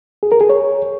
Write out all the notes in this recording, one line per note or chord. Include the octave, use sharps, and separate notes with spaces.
G#4
A#4
G#4
C#5